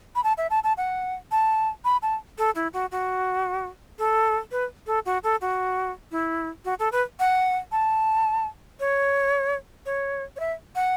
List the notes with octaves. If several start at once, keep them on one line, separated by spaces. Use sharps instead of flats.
B5
A5
E5
A5
A5
F#5
A5
B5
A5
A4
E4
F#4
F#4
A4
B4
A4
F#4
A4
F#4
E4
F#4
A4
B4
F#5
A5
C#5
C#5
C#5
E5
F#5